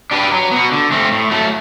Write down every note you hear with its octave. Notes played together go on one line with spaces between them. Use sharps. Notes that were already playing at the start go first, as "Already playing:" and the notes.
D4 G4 B4
F#3
B3 F#4
D3
A3 C4
A2
F#3 A3